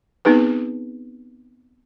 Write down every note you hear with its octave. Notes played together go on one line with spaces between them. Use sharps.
B3 C4 D#4 G#4 B4